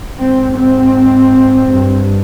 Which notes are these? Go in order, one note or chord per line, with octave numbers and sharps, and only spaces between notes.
G#2 C4
C4
G2